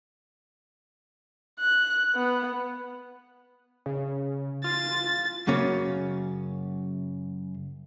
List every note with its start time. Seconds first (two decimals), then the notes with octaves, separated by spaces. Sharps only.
1.60 F#6
2.15 B3
3.86 C#3
4.64 F4 A6
5.47 F#2 C#3 A#3 C#4